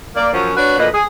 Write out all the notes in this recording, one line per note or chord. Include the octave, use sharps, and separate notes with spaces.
A#3 D5
F#2 F3 C#4 F#4
D4 F#4 B4 C#5
D2 A#2 B4 D#5
G#4